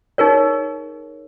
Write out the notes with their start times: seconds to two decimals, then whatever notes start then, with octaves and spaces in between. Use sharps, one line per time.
0.18 D#4 G#4 A#4 C#5